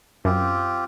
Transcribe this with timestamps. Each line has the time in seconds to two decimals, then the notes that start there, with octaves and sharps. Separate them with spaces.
0.25 F#2 C4 F4 G4